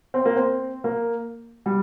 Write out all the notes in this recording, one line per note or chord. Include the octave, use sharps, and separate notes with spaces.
C4
A#3
C4
A#3
G3